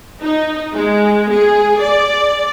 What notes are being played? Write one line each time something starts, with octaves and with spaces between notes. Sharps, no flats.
D#4
G#3
G#4
D5